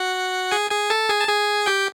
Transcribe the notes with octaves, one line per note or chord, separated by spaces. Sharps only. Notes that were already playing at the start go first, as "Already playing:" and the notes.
Already playing: F#4 F#5
G#4 G#5
G#4 G#5
A4 A5
G#4 G#5
A5
G#4 G#5
G4 G5